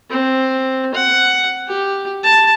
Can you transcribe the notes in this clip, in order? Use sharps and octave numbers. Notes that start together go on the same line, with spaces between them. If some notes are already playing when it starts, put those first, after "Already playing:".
C4
F#5
G4
A5